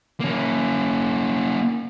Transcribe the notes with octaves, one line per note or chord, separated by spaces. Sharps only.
A#3 C#4